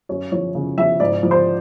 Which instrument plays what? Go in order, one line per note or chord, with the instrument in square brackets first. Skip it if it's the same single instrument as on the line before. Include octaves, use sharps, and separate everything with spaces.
[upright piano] F#2 C#5
F3 C#5
C#3
F3 E5
G#2 D5
F3
C5